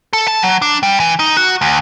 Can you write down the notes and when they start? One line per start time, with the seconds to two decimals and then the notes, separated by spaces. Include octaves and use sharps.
0.13 A4
0.28 A5
0.42 F#3
0.62 D4
0.83 G3
1.00 E3
1.19 D#4
1.37 F#4
1.61 D2